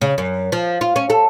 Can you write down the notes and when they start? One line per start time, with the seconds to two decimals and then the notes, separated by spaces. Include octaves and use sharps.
0.01 C#3
0.18 F#2
0.52 F3
0.81 F4
0.96 C#4
1.10 A4